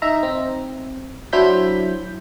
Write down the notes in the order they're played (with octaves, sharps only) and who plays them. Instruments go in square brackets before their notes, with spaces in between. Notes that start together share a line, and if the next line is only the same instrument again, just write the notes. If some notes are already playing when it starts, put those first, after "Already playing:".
[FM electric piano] D#4 E5 A#5
C4
F#3 D4 E4 C5 G6 B6